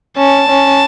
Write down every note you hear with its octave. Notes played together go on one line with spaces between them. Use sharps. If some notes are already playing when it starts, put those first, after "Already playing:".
C#4 A5
C#4